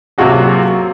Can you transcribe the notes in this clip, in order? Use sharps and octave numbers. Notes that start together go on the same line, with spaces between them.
C3 F#3 A#3 F4 F#4 G#4